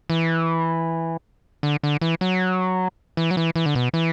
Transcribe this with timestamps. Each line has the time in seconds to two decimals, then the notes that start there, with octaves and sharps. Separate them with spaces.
0.10 E3
1.63 D3
1.83 D3
2.01 E3
2.21 F#3
3.17 E3
3.31 F#3
3.37 E3
3.56 E3
3.66 D3
3.75 B2
3.94 E3